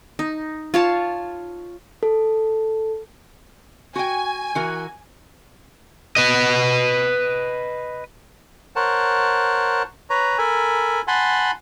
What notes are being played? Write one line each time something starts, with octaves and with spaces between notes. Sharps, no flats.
D#4
F4 C#5 A5
A4
F#4 G5 G#5
E3 F#4 A#4
B4 D#5
A#4 C5 C#5 F#5 A5
B4 C#5 A#5
A4 A#4 G#5 B5
F#5 G#5 A5 B5 C6